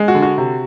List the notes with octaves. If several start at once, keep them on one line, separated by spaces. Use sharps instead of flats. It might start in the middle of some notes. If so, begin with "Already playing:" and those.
Already playing: G#3
F#4
D3
F#4
C3